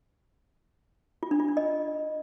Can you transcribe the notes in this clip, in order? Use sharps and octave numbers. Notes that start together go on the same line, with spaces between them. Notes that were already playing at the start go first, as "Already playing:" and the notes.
F4
D4
F4
D4
D#5